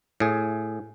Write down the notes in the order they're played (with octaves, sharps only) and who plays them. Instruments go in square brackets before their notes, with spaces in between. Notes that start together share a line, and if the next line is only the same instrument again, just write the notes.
[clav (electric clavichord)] A2 G#4